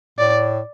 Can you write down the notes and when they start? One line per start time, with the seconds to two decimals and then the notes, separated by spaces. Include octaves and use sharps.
0.19 A2 D5